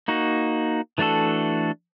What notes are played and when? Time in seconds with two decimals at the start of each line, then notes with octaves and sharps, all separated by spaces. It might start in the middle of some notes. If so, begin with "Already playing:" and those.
0.08 A#3 D#4 F#4
0.98 E3 A3 D4 F#4 A4